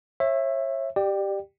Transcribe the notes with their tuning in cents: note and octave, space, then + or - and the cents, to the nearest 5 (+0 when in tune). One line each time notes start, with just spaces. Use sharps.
C#5 -35 E5 +5
G4 +0 D5 +25 G5 +0